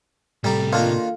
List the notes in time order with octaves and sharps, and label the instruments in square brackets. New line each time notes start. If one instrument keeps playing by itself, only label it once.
[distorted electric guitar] A2 C3 [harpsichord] G3 D5 [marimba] A4 A#5
[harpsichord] D#3 A#3 D4 [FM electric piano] F4